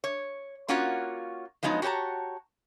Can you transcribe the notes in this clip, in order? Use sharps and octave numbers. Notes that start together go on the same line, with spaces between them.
C#5
A#3 C#4 F4 F#4 C#5 F#5
F3 F#3 G#3 B3 D#4
F#4 G4 C#5 A5 A#5